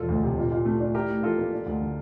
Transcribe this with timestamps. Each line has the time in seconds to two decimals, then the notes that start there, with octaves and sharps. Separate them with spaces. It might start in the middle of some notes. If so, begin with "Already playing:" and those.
Already playing: E1 F3 F4 A4
0.09 D2
0.23 C3
0.38 A#2
0.51 A#2
0.65 A3
0.80 D4
0.94 E4 G4 A#4
1.09 A2
1.23 F3 F4 A4
1.38 A#3
1.52 D4
1.66 D2
1.81 D3